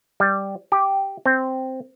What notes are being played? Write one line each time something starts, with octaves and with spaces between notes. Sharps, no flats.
G3
G4
C4